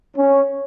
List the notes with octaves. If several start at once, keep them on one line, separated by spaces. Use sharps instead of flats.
C#4